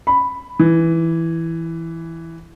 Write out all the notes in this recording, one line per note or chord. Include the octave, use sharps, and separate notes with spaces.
B5
E3